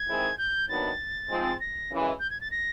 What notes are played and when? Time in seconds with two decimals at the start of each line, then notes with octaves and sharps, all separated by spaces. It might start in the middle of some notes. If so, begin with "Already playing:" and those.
Already playing: G#6
0.08 D#3 G#3 C4 E4 G#4
0.38 G6
0.68 D#2 D#3 F#3 B3 D4 A6
1.29 G#2 F3 G#3 C4
1.60 A#6
1.90 F#2 C#3 E3 G#3
2.19 G6
2.30 G#6
2.41 A6
2.51 A#6